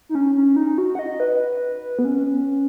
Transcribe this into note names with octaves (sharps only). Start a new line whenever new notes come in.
D#4
C#4
C#4
D#4
F#4
F#5
D#5
B4
B3
C#4